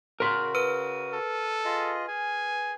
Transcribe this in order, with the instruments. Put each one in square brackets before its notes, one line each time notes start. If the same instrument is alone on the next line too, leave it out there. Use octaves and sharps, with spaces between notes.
[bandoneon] C#3 F#4 [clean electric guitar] A#4 C6
[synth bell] B4 F6 D#7
[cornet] A4
[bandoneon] F4 G#4 D#5
[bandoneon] G#4 [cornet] G#5